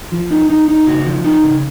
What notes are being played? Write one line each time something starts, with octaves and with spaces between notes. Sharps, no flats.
F3
D#4
D#4
D#4
C#3 F#4
F3
D#4
C#3